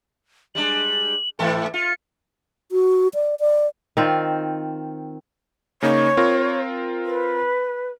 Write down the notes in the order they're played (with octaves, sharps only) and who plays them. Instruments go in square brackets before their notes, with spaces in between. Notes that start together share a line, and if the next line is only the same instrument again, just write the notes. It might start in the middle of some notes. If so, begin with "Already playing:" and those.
[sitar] G3 G#3 D4 [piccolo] F#7
[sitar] G#2 E3 A4 [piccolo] G5
[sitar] F4 [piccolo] C#7
[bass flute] F#4
D5
D5
[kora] D#3 C4 F4
[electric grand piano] C#3 A#3 D#4 [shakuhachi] C#5
[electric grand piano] C4 F4 A#4
[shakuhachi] B4